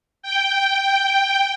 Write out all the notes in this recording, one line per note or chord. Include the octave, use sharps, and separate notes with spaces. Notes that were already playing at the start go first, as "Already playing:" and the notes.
G5